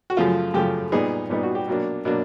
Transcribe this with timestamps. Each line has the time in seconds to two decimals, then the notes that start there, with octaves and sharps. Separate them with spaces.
0.10 F#4
0.17 F#2 C#3 F3 A3 F4
0.54 F#2 C#3 F3 A3 G4
0.92 A#2 G3 B3 D#4 G#4
1.30 A#2 G3 B3 D#4
1.43 F#4
1.55 G4
1.67 B2 F#3 A#3 D4
2.05 B2 F#3 A#3 D4